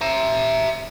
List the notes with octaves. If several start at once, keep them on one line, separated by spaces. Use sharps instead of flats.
E5 A#5